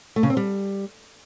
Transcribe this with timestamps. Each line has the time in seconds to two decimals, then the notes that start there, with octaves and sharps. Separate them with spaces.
0.16 A3
0.23 C#3
0.30 C4
0.37 G3